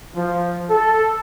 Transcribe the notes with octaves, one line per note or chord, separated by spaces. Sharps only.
F3
A4